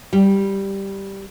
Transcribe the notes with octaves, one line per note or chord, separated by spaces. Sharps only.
G3